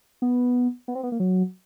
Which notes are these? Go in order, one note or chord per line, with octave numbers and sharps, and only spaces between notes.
B3
B3
C4
B3
A#3
F#3